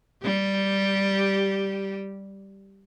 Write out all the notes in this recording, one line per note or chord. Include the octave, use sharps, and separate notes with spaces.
G3 G4